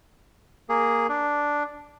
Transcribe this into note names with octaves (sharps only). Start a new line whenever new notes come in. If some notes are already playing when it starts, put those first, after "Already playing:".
A#3 G#4
D4